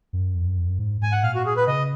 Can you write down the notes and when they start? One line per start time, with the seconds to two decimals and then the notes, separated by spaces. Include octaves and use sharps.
0.13 F#2
0.35 F2
0.46 F#2
0.57 F2
0.68 F#2
0.79 G#2
1.02 G#2 G#5
1.12 F#5
1.23 A#2 F5
1.35 F#4
1.46 G#4
1.57 B4
1.67 C#3 D#5